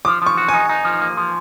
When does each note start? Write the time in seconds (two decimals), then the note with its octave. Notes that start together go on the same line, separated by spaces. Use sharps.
0.05 F3 D6
0.22 F3 C#6
0.37 F#4
0.48 G#5
0.54 D#4
0.69 D#4
0.85 F3
1.01 A#3
1.17 F3